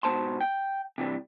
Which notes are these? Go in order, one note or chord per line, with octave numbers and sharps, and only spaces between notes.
G#2 B2 C4 C5 A5 C6
G5
C3 E3 G3